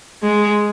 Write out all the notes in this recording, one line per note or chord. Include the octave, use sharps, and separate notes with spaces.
G#3